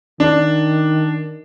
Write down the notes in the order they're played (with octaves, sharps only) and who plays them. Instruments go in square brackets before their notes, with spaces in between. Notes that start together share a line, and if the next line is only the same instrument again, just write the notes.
[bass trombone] D#3 [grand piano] D4